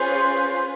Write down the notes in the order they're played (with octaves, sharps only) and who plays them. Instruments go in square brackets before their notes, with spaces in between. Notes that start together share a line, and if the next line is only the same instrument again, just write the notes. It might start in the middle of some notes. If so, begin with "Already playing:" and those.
Already playing: [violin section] C#4 F4 G#4 B4 [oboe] C5